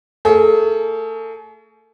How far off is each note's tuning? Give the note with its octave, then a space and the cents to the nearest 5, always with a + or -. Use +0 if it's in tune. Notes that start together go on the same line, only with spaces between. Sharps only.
A3 +35 G#4 +45